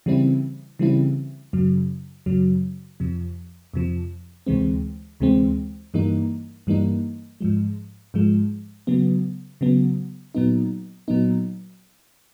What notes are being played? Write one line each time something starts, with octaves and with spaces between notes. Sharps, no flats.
C#3 E3 G3 C4 E4
C#3 E3 G3 C4 E4
F#2 C#3 F#3
F#2 C#3 F#3
F2 C3 F3
F2 C3 F3
D2 C3 E3 G#3 C4
D2 C3 E3 G#3 C4
G2 E3 G3 A#3 D#4
G2 E3 G3 A#3 D#4
G#2 F3 G#3
G#2 F3 G#3
C#3 F#3 B3
C#3 F#3 B3
A#2 F#3 B3 D#4
A#2 F#3 B3 D#4